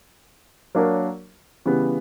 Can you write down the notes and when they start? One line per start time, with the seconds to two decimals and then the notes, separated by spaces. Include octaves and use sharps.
0.75 F#3 A#3 D4 A#4 C#5
1.66 C#3 E3 G3 B3